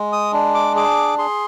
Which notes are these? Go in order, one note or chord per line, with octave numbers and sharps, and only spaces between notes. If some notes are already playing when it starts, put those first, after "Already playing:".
Already playing: G#3
D#6
D4
D6
G#4 D6
G#4 C6